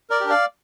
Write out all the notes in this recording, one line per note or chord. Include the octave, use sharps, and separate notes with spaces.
A#4 D5
D4 G4
D5 F5